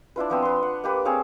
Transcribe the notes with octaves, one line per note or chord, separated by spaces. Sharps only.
D4 E4 F4 B4
F3 B3 C4
B3 C6
F#5
A#3 G4 B4
C4 G#4 C#5 F5